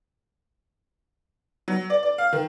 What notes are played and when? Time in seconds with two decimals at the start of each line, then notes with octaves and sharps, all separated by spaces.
1.68 F#3
1.90 D5
2.03 D5
2.18 F5
2.33 D#3